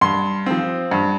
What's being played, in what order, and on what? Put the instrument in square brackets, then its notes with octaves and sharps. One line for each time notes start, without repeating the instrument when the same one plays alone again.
[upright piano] G2 C6
F3 C4
G2